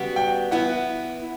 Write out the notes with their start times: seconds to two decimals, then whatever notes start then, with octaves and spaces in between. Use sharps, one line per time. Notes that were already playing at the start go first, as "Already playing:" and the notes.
Already playing: C#3 G3 B3 F#4
0.16 G5
0.51 E3 B3 E4 F#5